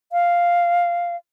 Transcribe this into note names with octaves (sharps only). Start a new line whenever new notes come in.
F5